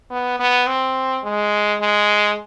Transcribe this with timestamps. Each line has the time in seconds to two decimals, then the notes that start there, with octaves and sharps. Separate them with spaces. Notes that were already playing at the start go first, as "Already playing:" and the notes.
0.11 B3
0.39 B3
0.67 C4
1.24 G#3
1.81 G#3